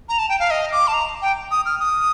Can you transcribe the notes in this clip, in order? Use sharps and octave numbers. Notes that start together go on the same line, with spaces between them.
A#5
A5
G5
F5
D#5
D6
A5
A#5
G5
D#6
F6
D#6